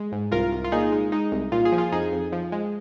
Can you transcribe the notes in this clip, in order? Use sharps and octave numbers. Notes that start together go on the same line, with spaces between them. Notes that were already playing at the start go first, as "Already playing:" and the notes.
Already playing: G#3
G#2
C2 F4 A#4
C2
F4
A#2 D#4 G#4
G#3
G#3 D#4
C2
A#2 F4
G#4
F3
F4
F2 D#4 G#4
F2
F3
G#3